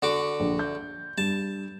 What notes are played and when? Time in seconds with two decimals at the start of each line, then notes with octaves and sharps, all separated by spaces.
0.02 D3 F#4 D6
0.40 A#1
0.59 G6
1.18 G2 A5